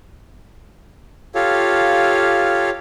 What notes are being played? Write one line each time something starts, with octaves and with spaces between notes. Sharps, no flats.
F4 G4 A4 C#5 F5